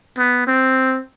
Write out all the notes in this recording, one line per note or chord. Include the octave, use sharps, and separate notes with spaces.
B3
C4